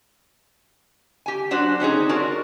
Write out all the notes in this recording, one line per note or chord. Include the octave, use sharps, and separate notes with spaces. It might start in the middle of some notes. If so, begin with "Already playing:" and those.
G4 G#5
F#3 D4 F#4 C5
C4 C#4 D#4 G#4
D4 F4 F#4 A#4 D5